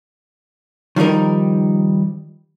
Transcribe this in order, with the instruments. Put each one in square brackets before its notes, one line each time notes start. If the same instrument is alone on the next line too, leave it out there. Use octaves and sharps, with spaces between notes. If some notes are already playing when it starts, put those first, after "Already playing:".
[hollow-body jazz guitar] D#3 F3 G3 D#4 A#4